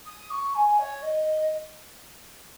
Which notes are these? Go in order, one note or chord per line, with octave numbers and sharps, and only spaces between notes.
D#6
C#6
G#5
C#5
D#5